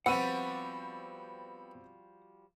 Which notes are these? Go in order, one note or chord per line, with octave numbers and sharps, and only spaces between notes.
F3 G3 B3 C4 F#4 F#5 E6 D#7